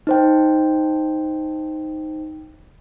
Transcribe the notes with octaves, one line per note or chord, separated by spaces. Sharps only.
D#4 C5 G5